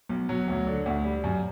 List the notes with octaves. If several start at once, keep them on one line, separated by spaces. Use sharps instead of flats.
B1
F#3
D2
D3
D2
G3
F#2